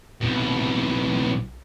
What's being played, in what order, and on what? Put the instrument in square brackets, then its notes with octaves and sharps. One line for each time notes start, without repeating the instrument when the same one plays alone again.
[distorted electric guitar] C2 B2